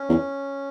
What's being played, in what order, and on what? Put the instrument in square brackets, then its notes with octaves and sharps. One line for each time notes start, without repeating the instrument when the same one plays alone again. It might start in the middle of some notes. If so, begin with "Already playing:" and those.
Already playing: [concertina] C#4
[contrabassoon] E2